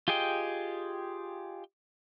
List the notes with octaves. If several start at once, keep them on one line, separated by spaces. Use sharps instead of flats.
F4 G4 G#4 D#5 G5